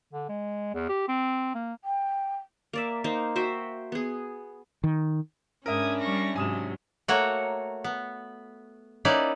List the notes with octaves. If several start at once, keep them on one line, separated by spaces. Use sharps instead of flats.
D3
G#3
E2
G4
C4
A#3
G5
A#3 D5 E5
A#3 D#4 C5
F#4 C5 E5 G5
B3 G#4
D#3
G#2 C#4 D4 E4 A#4 E5 D#6 G#6
G3 C#6 A#6
G#2 C3 F#3 G#5 D#6 E7
A3 A#3 F#4 C#5 F#5 A#5
B3
A#3 C#4 D#4 E4 B4 D5